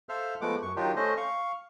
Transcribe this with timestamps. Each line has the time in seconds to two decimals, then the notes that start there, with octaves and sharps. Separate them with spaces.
0.09 A4 C5 E5 F5 F6
0.41 F3 G#3 A3 B3 F#5 D6
0.62 F#2 C#6
0.76 D#3 F#3 D4 D#4 F4 G4
0.96 A3 C#4 C5 D#5
1.17 F5 C#6